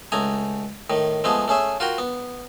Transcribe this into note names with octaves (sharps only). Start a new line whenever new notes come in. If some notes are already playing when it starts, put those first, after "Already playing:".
C#2 A3 G#5 A#5 D#6
A2 D#3
F3 G#3 A3 B3 G#4
A3 C#4 G#4 E5
F4 F#4 A#4 G5
B3